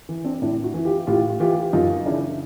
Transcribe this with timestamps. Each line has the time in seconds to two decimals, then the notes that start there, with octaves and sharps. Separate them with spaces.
0.09 E3
0.24 C4 D4
0.42 A2 D4 E4
0.64 E4 F#4
0.74 E3
0.85 F4 G4
1.07 A2 F4 G4
1.40 E3 F4 G4
1.73 F#2 D#4 F4
2.06 C#3 E3 D4 E4